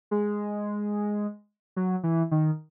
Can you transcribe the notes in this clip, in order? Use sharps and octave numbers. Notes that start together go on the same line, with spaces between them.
G#3
F#3
E3
D#3